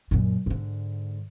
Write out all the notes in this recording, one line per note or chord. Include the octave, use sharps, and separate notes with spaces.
F#2 A#2
G#2 D3